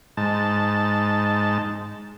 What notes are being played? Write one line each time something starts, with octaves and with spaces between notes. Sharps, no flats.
G#2 A5